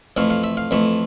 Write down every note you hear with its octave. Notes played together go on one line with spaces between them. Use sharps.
F2 E3 A3 F5
F5
E5
F5
F2 E3 A3